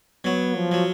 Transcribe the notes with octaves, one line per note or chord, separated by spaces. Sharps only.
F#3 B3
F3
F#3